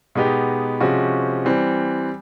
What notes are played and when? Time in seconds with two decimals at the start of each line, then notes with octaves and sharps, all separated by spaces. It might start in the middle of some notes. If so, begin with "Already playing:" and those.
0.15 B2 G#3 B3 D#4 G4
0.80 C3 F3 G#3 C#4 F#4
1.45 E3 G3 C4